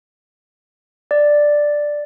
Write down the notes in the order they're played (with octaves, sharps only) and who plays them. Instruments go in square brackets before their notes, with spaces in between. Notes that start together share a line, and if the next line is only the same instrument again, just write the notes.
[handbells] D5